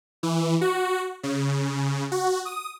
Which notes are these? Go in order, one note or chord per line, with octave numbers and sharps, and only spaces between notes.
E3
F#4
C#3
F#4
D#6